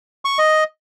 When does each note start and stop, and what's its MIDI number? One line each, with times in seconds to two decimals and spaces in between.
0.25 0.38 85
0.39 0.64 75